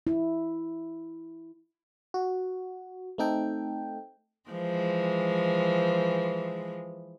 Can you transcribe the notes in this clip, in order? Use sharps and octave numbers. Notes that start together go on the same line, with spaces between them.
E4
F#4
A3 C4 D#4 A4 G5
E3 F3 G#3